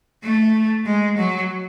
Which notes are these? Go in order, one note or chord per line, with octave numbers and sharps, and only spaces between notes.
A3
G#3
F#3